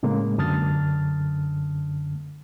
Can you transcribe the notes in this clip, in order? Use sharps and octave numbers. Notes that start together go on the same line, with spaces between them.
A2 C#3 G#3 A#3
F#2 D3 A5 D#6 F6 A6